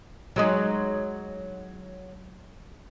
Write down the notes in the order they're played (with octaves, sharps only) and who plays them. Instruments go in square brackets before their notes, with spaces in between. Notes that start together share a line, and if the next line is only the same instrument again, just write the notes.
[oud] F#3 G#3 D#4